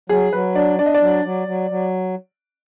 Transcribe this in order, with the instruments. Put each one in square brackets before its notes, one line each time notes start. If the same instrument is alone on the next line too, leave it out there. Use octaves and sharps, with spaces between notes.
[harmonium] F#3 [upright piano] G#4
[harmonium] F#3 [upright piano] B4
[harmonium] D4 [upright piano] D5
[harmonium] D4 [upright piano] D5
[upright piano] D#5
D5
[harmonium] F#3
F#3
F#3
F#3